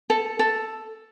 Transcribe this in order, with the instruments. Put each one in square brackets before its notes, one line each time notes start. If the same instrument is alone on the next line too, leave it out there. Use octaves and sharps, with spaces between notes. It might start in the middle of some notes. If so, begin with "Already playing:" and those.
[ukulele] A4
A4